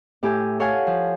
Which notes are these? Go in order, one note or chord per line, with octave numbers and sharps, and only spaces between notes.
A2 G4 E5 G#5
A4 C#5 F5 F#5 G#5
F3